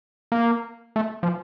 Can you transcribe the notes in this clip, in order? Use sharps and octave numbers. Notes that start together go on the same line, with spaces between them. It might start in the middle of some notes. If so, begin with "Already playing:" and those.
A#3
A3
F3